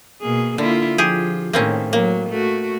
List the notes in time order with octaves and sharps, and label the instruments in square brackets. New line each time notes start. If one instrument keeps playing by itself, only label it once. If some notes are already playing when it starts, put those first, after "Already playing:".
[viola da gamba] B2 A#3 G#4
[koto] D3 [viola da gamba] A#3 E4 F4
[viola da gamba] F3 [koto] G4 G#4
[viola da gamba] A2 D#3 [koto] A#3 C4 C#4
[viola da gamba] F#3 [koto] A#3
[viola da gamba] A3 F#4